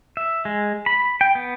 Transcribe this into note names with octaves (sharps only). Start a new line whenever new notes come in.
E5
G#3
B5
G5
B3